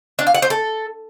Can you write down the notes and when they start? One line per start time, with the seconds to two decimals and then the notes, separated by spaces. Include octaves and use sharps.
0.19 D4
0.27 F5
0.34 F#5
0.42 C5
0.50 A4